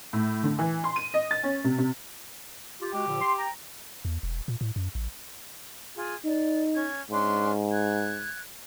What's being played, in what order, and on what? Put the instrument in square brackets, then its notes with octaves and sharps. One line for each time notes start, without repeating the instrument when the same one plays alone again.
[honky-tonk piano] A2
D3
E3
C6
D#7
D#5
A6
C#4
C3
C3
[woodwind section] F4 G4
[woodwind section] G#3 F#4 [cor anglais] G4
[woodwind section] A#2 D3 F3
C6
G5 A#5
[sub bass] E2
E1
A#2
A2
F#2
A1
[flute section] F4 G#4
[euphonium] D#4 [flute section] D5
[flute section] C#4 G#6
[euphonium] G#2 [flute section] C#4 D4 C6
[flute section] F#6 G#6